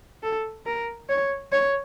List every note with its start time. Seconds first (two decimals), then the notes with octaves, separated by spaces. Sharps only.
0.23 A4
0.66 A#4
1.09 C#5
1.52 C#5